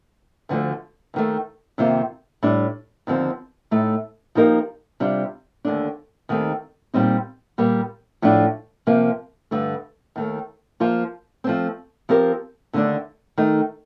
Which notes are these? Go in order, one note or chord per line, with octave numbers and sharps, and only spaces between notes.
D2 D3 F3 A3
D#2 D#3 A3
F2 C3 D#3 A#3 F4
A2 G3 D4
D#2 D3 F3 C4
A2 A3 D#4
F3 A#3 D#4 G4 A#4
C3 G3 D4 F4
D#2 D3 A3 D4
D#2 D#3 A3 C4
A#2 G3 C4 D#4
A#2 G3 A#3
A2 F3 A3 D4
C3 F3 A#3
G2 D3 A3
D#2 D#3 A3
F3 A#3 F4
F3 A3 C4
F3 C4 G4 A#4
D#2 D3 A3 D4
D#3 A3 D#4